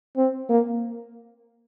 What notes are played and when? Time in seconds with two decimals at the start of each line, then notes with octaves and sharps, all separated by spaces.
0.17 C4
0.50 A#3